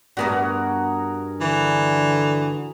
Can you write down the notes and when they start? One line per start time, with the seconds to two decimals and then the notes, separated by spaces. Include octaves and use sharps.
0.17 G2 B3 D4 F#4 G#4 A#4
1.41 D3 E3